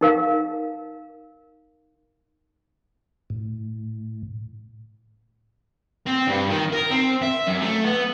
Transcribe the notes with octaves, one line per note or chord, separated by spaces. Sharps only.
D#4 A#4 F5
A2
C4
G2
D#3
A#4
C4
E5
F#2
A3
B3